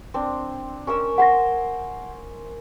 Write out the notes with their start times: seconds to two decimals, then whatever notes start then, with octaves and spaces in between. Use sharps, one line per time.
0.14 C4 D4
0.87 C#4 A#4 E6
1.18 C5 F#5 G#5 C6 A#6